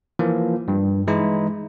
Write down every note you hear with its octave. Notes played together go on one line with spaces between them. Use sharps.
E3 F3 A#3
G2
E3 G#3 D#4 E4